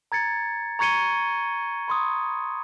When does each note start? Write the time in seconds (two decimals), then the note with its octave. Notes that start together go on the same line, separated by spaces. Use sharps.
0.12 A#5 G#6 A6 C#7
0.79 A#5 C#6 G#6 C#7 D#7 G7
1.88 B5 C6 D#6